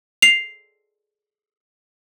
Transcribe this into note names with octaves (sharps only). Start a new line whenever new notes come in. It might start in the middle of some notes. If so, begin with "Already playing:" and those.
C7 F7